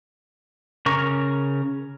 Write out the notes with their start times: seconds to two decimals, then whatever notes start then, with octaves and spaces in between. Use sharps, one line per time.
0.86 C#3 A#4 C#6